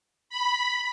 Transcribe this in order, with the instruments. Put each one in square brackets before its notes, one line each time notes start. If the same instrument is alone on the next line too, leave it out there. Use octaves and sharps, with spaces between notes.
[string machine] B5